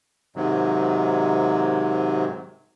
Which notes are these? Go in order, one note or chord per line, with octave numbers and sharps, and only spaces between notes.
G#2 C3 D#3 F#3